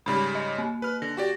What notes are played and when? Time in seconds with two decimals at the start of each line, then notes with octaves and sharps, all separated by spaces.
0.06 G#2 C#3 G3 B5
0.35 D#5
0.58 A#3
0.82 B4 F6
1.02 D3 A#6
1.17 F#4 G4 D5